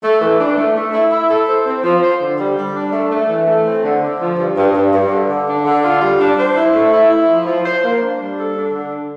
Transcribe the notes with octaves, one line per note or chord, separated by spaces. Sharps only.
A3
E3
D4
A3
A3
E4
E4
A4
C5
C4
F3
C5
D3
G3
G3
D4
A3
A3
E3
A3
C4
D3
D3
F3
G2
G2
G2
G2
D3
D3
D4
D3
F4
G3
D4
C5
E4
A3
E4
E4
F3
F3
C5
A#3
D4
G3
A4
D4
D3